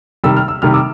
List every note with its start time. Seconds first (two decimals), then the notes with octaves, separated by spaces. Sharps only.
0.24 C3 D#3 G3 E6
0.37 F6
0.48 E6
0.62 C3 D#3 G3 F6
0.74 D6 E6